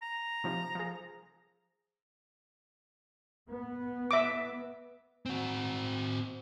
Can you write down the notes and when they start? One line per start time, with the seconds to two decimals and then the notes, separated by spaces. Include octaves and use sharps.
0.03 A#5
0.44 C3 F3 D#4
0.75 F3 G#4
3.49 B3
4.11 E5 D6
5.26 C4 F#4